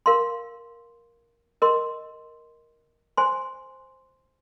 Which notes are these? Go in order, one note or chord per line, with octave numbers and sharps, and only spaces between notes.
A#4 F5 C6
A#4 D#5 C6
C5 G#5 C6